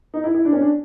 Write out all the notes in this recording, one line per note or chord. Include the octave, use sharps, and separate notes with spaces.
D#4
E4
E4
D4
C#4
D4